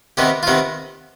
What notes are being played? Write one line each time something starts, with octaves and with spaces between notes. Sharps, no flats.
C3 D#3 B3 D#4 G4
F4
C3 D#3 B3 D#4